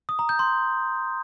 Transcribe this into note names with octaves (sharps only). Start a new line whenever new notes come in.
D#6
A#5
G6
C6